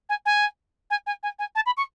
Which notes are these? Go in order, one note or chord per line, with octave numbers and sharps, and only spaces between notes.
G#5
G#5
G#5
G#5
G#5
G#5
A5
B5
C#6